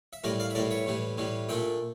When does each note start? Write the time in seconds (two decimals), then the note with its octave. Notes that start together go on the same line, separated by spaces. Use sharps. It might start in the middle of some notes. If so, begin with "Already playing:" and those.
0.13 E5
0.24 A2 E3 G3 A#4 D5
0.40 D5 F5
0.50 E5
0.55 A2 E3 G3 A#4 D5
0.71 C#5 E5
0.86 A2 E3 G3
1.18 A2 E3 G3
1.49 A#2 A3 D4 E5 G5